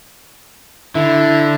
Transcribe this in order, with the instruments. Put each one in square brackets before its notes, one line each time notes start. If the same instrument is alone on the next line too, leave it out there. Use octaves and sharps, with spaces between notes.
[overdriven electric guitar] D3 [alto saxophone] E4